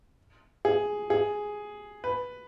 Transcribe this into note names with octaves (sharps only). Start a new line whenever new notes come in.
G#4
G#4
B4